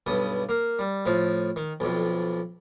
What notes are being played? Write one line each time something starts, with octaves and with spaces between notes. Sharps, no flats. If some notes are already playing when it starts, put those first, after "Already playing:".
B1 G2 D#6
A#3
G3
A2 F3
D#3
B1 F2